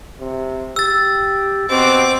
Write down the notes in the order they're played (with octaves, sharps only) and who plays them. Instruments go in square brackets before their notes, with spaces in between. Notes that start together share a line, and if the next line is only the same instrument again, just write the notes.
[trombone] C3
[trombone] G4 [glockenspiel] E6 A6
[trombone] B2 [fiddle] C4 D6